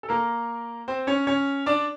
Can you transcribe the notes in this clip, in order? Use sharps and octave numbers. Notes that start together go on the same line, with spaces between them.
A4
A#3 A#4
C4 C5
C#4 C#5
C#4 C#5
D4 D5